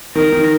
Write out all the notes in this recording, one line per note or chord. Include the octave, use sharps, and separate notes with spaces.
D#3 A#4
D#3